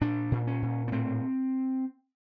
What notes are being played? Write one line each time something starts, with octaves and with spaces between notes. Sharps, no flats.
A#2 D4
A#2
C#4
A#2
B3
A2 C4